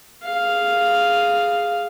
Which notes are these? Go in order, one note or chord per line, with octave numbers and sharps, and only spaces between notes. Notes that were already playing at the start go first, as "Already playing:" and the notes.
G#4 F5